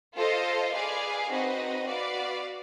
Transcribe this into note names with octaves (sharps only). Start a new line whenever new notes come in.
F4 A4 C5 D#5
G#4 B4 D5 F5 G#5
C4 D#4 F#4 B4 D#5
F#4 B4 D5 F5